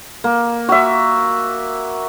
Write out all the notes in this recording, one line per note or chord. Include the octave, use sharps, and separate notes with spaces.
A#3
F#4 E5